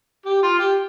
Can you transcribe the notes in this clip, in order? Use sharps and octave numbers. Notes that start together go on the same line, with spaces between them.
G4
F4
G4